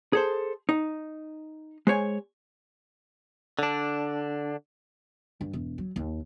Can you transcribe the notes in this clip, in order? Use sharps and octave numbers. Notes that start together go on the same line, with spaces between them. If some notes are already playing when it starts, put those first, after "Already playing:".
G#4 A4 C5
D#4
G#3 C5 C#5 G#5
D3 D4
G2
E1
F#3
D#2